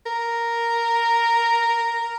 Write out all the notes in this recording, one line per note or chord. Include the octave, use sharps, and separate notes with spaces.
A#4